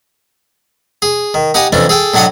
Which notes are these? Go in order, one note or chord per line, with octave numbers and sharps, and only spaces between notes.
G#4
D#3
D#4 G4 F#5 G#5 A#5 D#6
F2 E3 A3 C#4 D4
G#4 A4 G5
A2 F#3 D4 F#4 C#5 D#5